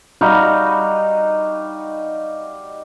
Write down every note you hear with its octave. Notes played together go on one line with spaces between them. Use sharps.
G3 D#4 F#4 F5